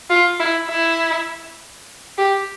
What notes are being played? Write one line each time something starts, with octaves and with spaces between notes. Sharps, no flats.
F4
E4
E4
G4